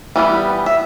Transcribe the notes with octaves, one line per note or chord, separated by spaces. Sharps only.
E3 G3 B3
E5